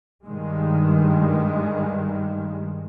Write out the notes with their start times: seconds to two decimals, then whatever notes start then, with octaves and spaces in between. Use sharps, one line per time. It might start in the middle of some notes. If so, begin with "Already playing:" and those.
0.24 G2 D#3 G3 G#3